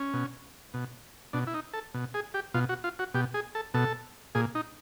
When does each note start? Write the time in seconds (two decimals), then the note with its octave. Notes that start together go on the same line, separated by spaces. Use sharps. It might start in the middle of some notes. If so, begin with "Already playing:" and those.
Already playing: C#4
0.14 B2
0.74 B2
1.33 B2 D4
1.47 E4
1.54 D#4
1.74 A4
1.94 B2
2.14 G#4
2.34 G4
2.54 B2 F4
2.69 F#4
2.84 F4
2.99 F#4
3.14 B2 G4
3.34 G#4
3.55 A4
3.74 B2 A4
4.35 A#2 G#4
4.55 D#4